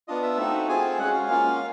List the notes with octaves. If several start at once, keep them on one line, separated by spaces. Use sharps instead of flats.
B3 D4 F4 D#5
E5
A3 C4 D#4 F#4
C4 F4 G#4 G#5
G#3 C#4 F#4 F#5
F5
A#3 C#4 F4